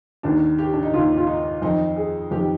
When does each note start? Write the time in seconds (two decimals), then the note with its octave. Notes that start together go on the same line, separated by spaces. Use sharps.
0.23 D#2 D#3 D4
0.58 G4
0.73 D4
0.83 D#4
0.93 D#2 D#3 F4
1.17 F4
1.27 D#4
1.62 F2 D#3 D#4
1.96 G#4
2.31 F2 D#3 G4